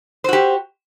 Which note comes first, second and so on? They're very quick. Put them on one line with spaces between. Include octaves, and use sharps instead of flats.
C5 F#4 G4